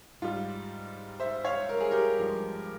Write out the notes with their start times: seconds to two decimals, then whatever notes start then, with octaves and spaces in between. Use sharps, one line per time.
0.22 G#2 G3 F4
1.20 C5 E5
1.45 C#5 F5
1.69 A#4
1.80 G#4
1.91 G4 A#4
2.18 G2 F3 G#3